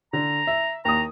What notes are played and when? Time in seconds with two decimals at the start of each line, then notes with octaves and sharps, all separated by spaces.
0.13 D3 A#5
0.47 E5
0.85 D#2 A#5 D#6